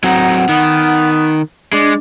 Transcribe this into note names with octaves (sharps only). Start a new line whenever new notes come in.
F#3 C4 D#4 F#5
D#3 B3
G#3 D4 D5